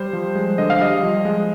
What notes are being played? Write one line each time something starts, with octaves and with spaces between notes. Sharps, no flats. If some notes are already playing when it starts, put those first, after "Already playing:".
Already playing: G3 C5
F3
G#3
D3 D#5
F5
G3 D#5
F3
G#3